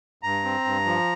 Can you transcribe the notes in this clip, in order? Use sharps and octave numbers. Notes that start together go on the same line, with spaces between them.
G2 A#5
C4
G2
F3